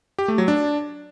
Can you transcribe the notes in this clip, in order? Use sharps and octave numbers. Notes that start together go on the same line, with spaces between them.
G4
A3
F#3
D4